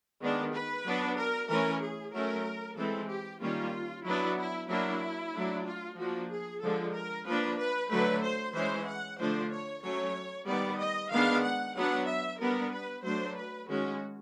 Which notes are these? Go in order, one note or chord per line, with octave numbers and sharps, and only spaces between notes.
D#3 G#3 B3 D4
B4
F#3 B3 D4
A#4
E3 A3 C#4 A#4
G#4
F#3 A3 C#4 A#4
E3 G#3 C4 A4
G4
D#3 G3 A#3 C#4 F4
F#3 B3 D4 E4
E4
F#3 A#3 D4 E4
F#3 A3 D4
F4
F3 A#3 D4 F#4
G#4
D3 F3 G#3 A4
A#4
F3 A#3 D4 B4
B4
D3 F#3 A3 B4
C5
E3 G#3 C#4 C5
F#5
D3 F3 A3 D4 C5
C#5
F#3 A3 C#4 C#5
D#3 G3 B3 D5
D#5
D#3 G#3 B3 D4 F5
F#5
F#3 B3 D4 F#5
E5
G3 B3 D4 A#4
B4
F#3 A3 D4 C5
B4
D#3 G#3 C#4 F#4